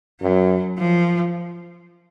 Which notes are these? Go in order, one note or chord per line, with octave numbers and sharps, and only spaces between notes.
F#2 F#3
F3